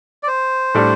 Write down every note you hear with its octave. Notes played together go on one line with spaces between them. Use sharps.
D5
C5
A2 G3 D4 A4 D5